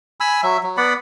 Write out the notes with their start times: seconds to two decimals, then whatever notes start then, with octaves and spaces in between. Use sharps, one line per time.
0.20 G#5 B5 E6
0.43 F#3 E5
0.63 F#3
0.77 B3 D5 F#5 B5